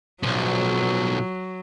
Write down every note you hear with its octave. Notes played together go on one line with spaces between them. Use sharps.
B1 F3 F#3